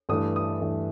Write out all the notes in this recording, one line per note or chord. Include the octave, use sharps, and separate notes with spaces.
G2 E3 A3 D#6
D#6
G2 E3 A3